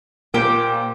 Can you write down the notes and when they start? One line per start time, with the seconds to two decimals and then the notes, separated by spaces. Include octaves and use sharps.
0.34 A#2 A#3 G4 C5 G5